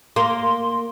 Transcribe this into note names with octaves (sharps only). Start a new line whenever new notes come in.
A#3 C6